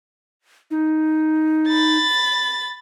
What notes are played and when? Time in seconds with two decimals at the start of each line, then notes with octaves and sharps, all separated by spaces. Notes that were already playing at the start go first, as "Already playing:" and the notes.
0.71 D#4
1.68 B5 A6